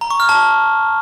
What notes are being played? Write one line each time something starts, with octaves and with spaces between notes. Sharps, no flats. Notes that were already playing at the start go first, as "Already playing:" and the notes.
A#5
C#6
F6
A5